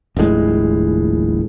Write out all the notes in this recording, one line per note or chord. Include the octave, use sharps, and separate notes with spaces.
D#1 A#1 A2 G#3